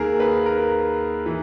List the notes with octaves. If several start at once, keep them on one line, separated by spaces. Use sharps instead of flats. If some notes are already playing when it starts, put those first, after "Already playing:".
Already playing: D#2 D#3 G#4 A#4
B4
A#4
E3